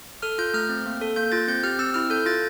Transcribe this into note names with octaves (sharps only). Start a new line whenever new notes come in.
A4 F6
F4 G6
A3 F6
C4
A#3
A4
A#3 G6
F4 A6
C4 G6
G4 F6
C4 E6
E4 F6
A4 G6
F4 A6